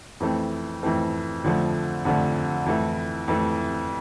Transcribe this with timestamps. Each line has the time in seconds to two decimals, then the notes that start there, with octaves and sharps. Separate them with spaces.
0.20 F2 E3 A3 C4
0.83 F2 E3 A3 C4
1.44 F2 D3 F3 A3
2.05 F2 D3 F3 A3
2.66 F2 E3 A3 E4
3.28 F2 E3 A3 E4